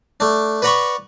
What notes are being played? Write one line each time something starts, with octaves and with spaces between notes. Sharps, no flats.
A3 D4
B4 D5 F#5 A#5 B5 C#6